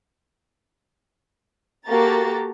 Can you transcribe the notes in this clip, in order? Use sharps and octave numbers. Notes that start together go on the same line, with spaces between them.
A#3 F#4 G4 A4 A#5 A6